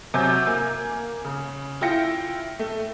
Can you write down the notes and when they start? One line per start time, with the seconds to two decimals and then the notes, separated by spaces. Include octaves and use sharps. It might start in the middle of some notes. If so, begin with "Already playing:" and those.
0.14 C3 F#3 G#5 G6
0.47 A#3 G#5
1.25 C#3
1.81 E4 F4 G5 A#6 C#7
2.59 A3